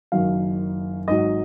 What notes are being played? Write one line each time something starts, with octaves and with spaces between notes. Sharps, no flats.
F#1 F#2 D#3 F#3 F5
G#1 G#2 F#3 D#5